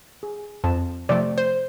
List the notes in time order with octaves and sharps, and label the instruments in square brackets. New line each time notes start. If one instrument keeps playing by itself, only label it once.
[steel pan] G#4
[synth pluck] F2 [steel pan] A5
[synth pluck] C3 F3 A3 [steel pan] D5
[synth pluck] C5